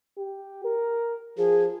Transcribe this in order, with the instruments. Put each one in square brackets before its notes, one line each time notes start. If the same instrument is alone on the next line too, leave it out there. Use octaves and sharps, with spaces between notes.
[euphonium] G4
A#4
[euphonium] F3 [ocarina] G#4